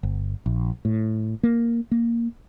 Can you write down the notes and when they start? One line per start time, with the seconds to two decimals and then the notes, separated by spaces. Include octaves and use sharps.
0.03 G1
0.46 A#1
0.85 A2
1.43 A#3
1.91 A#3